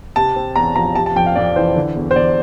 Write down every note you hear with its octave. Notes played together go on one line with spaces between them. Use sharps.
C3 A5
C4
E2 A#5
F3 A#5
C3 A5
A5
F2 G5
F5
F2 D5
E3 C5
D3
E2
C5
E2 D5